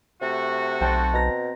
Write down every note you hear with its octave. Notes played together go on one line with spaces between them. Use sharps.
C3 A3 F#4
B1 C4 G5 A5
B2 A#5 A#6